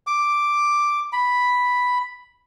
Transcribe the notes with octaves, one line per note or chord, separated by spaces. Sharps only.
D6
B5